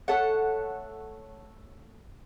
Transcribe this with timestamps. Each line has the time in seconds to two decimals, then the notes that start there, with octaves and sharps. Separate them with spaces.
0.08 A3 A4 C#5 F#5